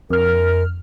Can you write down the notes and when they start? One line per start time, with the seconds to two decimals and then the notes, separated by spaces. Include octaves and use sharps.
0.10 F2 A#4 F6